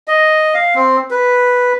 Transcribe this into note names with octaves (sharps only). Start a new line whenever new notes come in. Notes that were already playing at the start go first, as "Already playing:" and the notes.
D#5
F5
C4
B4